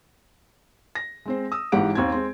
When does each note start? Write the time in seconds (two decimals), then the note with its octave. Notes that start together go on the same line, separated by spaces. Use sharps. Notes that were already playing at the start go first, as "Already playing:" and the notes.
0.95 A#6
1.25 G#3 C4 C5
1.52 D#6 E6
1.72 G#1 G#2 E3 G4 F#5 D7
1.95 D#2 C4 G#6
2.12 G#3 C4